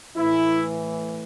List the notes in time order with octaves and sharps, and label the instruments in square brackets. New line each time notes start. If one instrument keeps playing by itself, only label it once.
[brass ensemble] A2 E3 E4